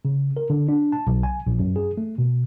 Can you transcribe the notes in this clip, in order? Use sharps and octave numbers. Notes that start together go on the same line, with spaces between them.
C#3
A#4
D3
D4
A5
B1
G#5
A#1
F#2
G#4
A3
B2